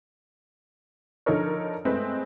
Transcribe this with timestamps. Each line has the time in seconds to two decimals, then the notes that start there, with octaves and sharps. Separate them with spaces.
1.26 D3 F3 D#4 A4 A#4 C#5
1.85 G#3 A3 C4 B4